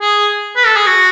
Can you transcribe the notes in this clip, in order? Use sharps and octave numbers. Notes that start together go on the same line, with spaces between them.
G#4
B4
A4
G#4
F#4